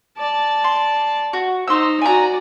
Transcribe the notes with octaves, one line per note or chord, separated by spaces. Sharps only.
D5 A5
C6
F#4
D#4 C5 C6 E6
F#4 D5 G#5 A#5